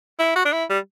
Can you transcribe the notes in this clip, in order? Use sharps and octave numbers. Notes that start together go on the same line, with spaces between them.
E4
F#4
D4
E4
G3